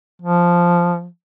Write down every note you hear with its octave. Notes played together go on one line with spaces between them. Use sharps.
F3